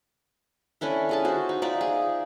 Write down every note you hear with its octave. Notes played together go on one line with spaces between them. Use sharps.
C#4 D4 E4 A4
C#4 G#4 A5
F#4 C5
D#4
D#4 F4 D5 E5
G#4